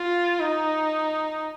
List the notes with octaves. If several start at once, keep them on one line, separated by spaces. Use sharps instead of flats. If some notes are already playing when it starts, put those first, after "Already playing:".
Already playing: F4
D#4